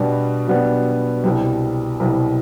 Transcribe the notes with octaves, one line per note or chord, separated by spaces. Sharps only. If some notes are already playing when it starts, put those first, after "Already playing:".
Already playing: B2 G3 B3 D4
B2 G3 B3 D4
C2 B2 G3
C2 B2 G3